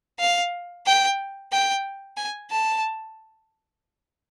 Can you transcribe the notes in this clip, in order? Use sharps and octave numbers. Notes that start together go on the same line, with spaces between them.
F5
G5
G5
G#5
A5